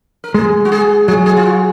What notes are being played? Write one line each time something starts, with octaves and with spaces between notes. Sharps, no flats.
A#4
G#3 G#4
F#4
G#4
F#3 G#4
G#4
F4
F#4